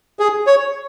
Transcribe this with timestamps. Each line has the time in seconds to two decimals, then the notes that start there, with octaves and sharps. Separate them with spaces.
0.19 G#4
0.47 C#5